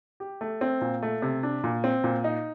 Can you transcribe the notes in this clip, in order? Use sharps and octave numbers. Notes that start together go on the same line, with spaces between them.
G4
A3
C4
A#2
A3
C3
D4
A#2
C4
A#2
D#4